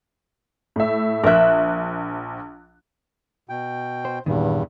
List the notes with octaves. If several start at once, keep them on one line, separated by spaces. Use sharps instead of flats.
A2 E5
A#1 A#4 E5 F#6
B2 G5
C5
E2 G2 A#2 D#3